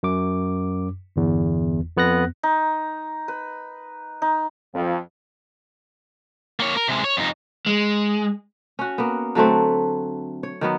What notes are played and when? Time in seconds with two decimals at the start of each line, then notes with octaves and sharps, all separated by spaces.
0.03 F#2 D6
1.16 G1 E2
1.97 F2 B3 F#6 A#6
2.43 D#4
3.28 B4
4.22 D#4
4.74 F2
6.60 A#3 C#5
6.77 A#4
6.88 C3 G#3
7.04 C#5
7.17 F2 D#4
7.66 G#3
8.79 C#4 F#4
8.98 A#3 B3
9.35 D3 F#3 A3 C4
10.43 C#5
10.61 D#3 F#3 B3